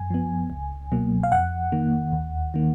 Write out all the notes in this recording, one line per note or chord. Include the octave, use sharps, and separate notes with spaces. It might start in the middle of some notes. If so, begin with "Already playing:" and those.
Already playing: F#2 G#5
F3 B3
C#2
B2 F#3 A#3
F5
F2 F#5
D#3 A#3
D#2
D#3 A#3